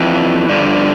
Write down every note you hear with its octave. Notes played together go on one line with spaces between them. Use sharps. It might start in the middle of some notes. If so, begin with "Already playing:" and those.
Already playing: F2 E3
G2 D3 F3